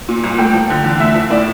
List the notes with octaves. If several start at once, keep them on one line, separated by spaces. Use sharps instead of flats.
A#2
C2
A3 G5
F3
D3
E2
A3 E5
F3
A2 D5